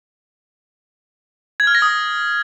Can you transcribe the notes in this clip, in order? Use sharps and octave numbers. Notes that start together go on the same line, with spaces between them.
G#6
F6
A#6
D#6